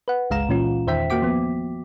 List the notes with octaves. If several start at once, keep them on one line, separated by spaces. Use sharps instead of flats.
B4 F#5
G1 C#2 G#3 F5 A#5 E7
A#2 E3 C#4 F4
E2 D#3 C5 E5 G5 B6
A#3 F#4 G5 D6 B6
F3 B3